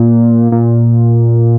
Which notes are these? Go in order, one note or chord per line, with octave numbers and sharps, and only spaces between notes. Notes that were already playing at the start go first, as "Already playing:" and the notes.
Already playing: A#2
A#2